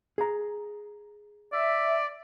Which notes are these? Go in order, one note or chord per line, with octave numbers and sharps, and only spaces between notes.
G#4 A#5
D5 E5